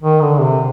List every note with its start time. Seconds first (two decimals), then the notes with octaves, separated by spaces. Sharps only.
0.02 D#3
0.21 D3
0.40 C3